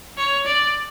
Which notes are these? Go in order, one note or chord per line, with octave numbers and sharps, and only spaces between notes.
C#5
D5